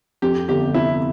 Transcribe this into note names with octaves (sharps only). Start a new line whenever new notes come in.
F2 G4
G1 G4
C3 E4